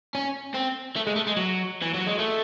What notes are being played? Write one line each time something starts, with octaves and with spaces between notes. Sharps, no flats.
C#4
C4
A3
G#3
A3
G#3
F#3
E3
F#3
G#3
A3